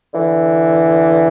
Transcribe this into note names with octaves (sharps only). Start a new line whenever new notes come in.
D3 E3